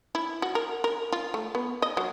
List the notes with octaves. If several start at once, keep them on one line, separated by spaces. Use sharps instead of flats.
E4
F#4
A#4
A#4
F4
A3
B3
D#5
F#3